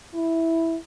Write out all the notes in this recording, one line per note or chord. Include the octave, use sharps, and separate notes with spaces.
E4